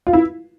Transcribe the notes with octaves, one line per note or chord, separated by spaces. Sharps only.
F4
E4